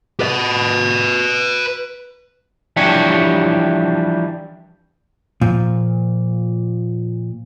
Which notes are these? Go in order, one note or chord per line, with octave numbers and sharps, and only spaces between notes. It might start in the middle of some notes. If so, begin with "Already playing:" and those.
B4 D#5
E3 F3 G3 D4 G4 C#5
A#2 F3